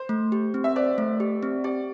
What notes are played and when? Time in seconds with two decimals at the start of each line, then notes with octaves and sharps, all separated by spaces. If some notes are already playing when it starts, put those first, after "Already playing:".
Already playing: C5
0.09 A3
0.32 G4
0.54 C4
0.64 E5
0.76 C5 D5
0.98 A3
1.20 G4
1.43 C4
1.64 G4 D5